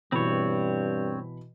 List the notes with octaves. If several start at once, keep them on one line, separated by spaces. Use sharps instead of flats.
G2 B2 E3 C4 C#5 B5